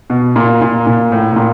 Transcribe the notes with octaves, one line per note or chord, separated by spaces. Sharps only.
B2
A#2
A#2
A#2
A2
A2
A#2